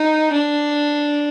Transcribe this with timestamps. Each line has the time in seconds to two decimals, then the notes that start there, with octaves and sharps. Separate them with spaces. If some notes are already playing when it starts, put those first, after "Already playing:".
Already playing: D#4
0.33 D4